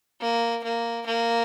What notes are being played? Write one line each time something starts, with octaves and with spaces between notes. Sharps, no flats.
A#3
A#3
A#3